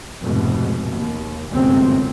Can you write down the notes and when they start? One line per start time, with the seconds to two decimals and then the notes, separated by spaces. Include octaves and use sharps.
0.23 F1 G#2 B2
0.94 D#2
1.51 G1 C#2 F#2 A2 C3 C4